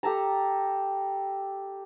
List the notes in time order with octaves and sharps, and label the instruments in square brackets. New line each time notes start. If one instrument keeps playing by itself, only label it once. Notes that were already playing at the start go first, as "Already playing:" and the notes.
[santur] G4 A4 A5 A#5